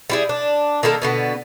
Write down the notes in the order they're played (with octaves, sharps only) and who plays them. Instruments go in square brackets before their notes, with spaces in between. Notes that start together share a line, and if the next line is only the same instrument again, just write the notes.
[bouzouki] G3 E4 G#4
D4
D#3 A#3 A4 A#4
B2 D3 B3